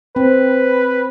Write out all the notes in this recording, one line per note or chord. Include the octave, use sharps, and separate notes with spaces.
C4 B4